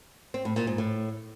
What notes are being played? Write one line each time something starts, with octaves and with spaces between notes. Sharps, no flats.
C4
A2
A#2
G#2
A2